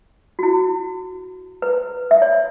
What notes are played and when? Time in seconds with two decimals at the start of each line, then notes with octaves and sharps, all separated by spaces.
0.39 F#4
0.43 E4
1.62 B4
2.11 E5
2.22 C#5